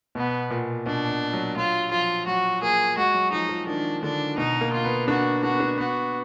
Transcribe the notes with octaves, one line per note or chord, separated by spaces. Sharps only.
B2 B3
A#2
B2 D4
B2
F#3
F#3 F4
F3 F4
F#3 F#4
A#3 G#4
G#3 F#4
F#3
F3 D#4
F3
D#3 D4
D3 D4
B2 D#4
A#3
F4
B3
D4 F#4
D4 F#4
B3
D4
B3 F#4